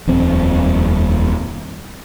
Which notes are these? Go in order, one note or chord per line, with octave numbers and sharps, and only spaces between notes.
D#1 F2 C4